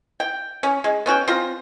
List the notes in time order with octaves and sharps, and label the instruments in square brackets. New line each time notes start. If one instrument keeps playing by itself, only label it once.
[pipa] G5
C#4
G#3
B3 C#4 F#4 G5
C4 F4 A#5